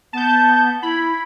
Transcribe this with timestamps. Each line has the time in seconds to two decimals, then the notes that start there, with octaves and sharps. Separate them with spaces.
0.13 B3 A5 G6
0.83 E4 B5